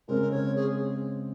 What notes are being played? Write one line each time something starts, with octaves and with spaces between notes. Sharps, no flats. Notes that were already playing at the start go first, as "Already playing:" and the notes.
C#3 G#3 C4 A#4
C#5
G#4